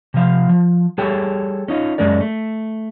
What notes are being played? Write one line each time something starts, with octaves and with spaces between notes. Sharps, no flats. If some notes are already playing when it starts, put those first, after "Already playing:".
C3 F3 F5
F3
G3 G#4 A4 C#5 G5
C#4 D#4 F4
F#2 G#3 C#4 A#4 D5
A3